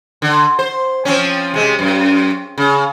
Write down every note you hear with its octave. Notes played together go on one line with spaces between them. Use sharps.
D3
C5
F3 C4 C#4
C3 G#3
F#2
C#3